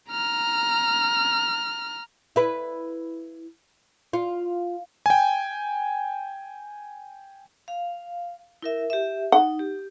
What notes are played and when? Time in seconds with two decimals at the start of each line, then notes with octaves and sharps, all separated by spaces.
0.11 A#5 F6
2.36 E4 B4
4.13 F4
5.06 G5 G#5
7.68 F5
8.62 E4 A#4 E5
8.90 G4 E5
9.32 D#4 F#5
9.59 G4